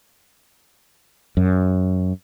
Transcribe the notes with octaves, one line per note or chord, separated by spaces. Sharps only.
F#2